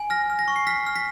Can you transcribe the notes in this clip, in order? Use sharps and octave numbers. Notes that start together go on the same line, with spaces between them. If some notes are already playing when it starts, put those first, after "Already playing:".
Already playing: G#5
F6 A#6
F6
A#6
C#6
C7
F6 B6
F6
B6